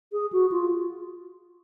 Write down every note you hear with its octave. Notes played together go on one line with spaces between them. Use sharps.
G#4
F#4
F4